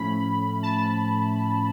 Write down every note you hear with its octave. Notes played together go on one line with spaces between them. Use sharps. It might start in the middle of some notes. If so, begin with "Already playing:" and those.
Already playing: A2 F3 A3 C#4 B5
A5